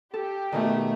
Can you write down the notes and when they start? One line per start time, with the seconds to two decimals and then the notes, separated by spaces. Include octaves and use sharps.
0.14 G4 A4
0.52 B2 D#3 A3